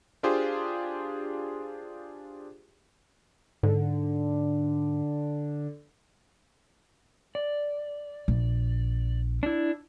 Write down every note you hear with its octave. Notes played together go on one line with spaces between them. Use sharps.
D4 F4 G4 G#4 C5
G#2 D3
D5
A#1
D4 E4